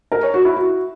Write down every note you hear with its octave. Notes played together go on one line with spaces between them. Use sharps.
A#4
C#5
F#4
E4
F#4